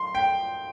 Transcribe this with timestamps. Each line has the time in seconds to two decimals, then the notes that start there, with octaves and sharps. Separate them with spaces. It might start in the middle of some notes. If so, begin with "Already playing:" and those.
Already playing: C6
0.15 G5